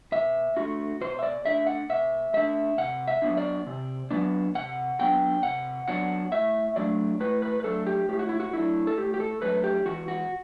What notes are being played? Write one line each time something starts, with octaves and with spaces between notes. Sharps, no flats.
B2 E5
A3 D4 F#4
B2 C5
E5
D5
A3 D4 E5
F#5
B2 E5
A3 D4 E5
C3 F#5
E5
F#3 B3 D4
D5
C3
F#3 B3 D4
C3 F#5
F#3 B3 D4 G5
C3 F#5
F#3 B3 D4 F#5
A2 E5
F#3 A3 D4 D5
A2 B4
B4
B4
F#3 A3 D4 A4
G4
A2 G4
F#4
E4
F#4
F#3 A3 D4 E4
A4
A2 G4
G4
A4
F#3 A3 D4 B4
G4
E2 F#4
F#4